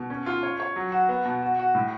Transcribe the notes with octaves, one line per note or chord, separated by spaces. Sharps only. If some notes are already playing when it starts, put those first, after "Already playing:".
Already playing: B2
C#4
F4
C#5
C#5
F#3
F#4
B3
B2
F#4
F#4
A2